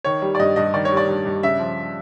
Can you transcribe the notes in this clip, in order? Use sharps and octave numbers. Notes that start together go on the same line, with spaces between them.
D#3 C#5
G3
D5
G2 D#5
G2 D#5
D#3 D5
C#5
G3
D5
G2
G2
C#3 E5
F3